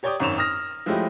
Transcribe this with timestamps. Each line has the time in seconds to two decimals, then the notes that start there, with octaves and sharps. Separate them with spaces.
0.03 G4 C#5 D5 G5 D6 D#6
0.20 G#1 F#2 C#4 C#6 E7 F7
0.38 D#6 F6 A#6
0.86 F3 G#3 A3 C#4 E4 G4